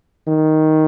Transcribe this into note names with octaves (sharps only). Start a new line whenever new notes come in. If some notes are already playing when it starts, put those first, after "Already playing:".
D#3